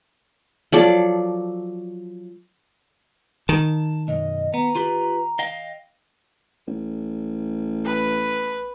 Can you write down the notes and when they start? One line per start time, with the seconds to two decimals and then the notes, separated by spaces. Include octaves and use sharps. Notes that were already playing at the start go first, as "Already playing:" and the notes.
0.72 F3 F#3 A4 D5
3.49 D#3 A5
4.08 B1 F#2 D#5
4.54 B3 A#5
4.75 F4 G4 B4
5.39 D#5 F5 G5
6.67 A1
7.85 B4